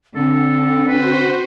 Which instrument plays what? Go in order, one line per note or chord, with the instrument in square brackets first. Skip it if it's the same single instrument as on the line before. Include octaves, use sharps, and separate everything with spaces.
[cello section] D3 [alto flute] C4 [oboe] A4
[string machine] F#4 C5 [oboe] B4